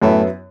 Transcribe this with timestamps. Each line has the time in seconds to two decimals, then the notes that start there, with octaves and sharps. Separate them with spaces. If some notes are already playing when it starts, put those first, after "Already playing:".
0.02 F#2 A2 F#3 B3 E4